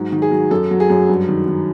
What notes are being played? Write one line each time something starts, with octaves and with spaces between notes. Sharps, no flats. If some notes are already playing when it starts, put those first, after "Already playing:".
Already playing: G#2 F#3
D#3
G#4
F#3
F#2 A4
F#3
G#4
F#2
G2
D#3
D#3